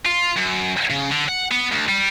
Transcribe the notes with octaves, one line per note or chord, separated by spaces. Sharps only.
F4
F#2
C#3
D3
F#5
B3
D2
G3